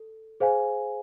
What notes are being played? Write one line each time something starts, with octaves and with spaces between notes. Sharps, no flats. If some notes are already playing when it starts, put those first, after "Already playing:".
Already playing: A4
G#4 C5 F5 G#5